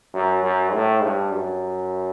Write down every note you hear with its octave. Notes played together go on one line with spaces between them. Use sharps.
F#2
F#2
A2
G2
F#2